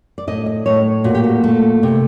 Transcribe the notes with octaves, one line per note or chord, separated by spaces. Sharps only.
D5
A2 D#5
D#5
A2 C#5
A#2 F#4
G4
F#4
A3
C3